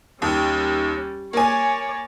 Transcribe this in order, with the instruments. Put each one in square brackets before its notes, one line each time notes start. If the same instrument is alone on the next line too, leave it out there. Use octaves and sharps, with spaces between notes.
[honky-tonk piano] D#2 [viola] G3 C#4
[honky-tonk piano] A#3 G#5 [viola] C#5 D5